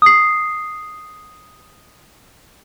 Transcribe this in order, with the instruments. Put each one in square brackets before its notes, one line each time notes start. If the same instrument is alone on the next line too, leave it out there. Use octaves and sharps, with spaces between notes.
[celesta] D#6 C7